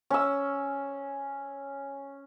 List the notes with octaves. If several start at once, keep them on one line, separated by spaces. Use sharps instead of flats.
C#4 E6